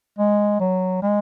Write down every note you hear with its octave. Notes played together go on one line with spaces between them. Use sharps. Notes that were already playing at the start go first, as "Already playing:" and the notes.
G#3
F#3
G#3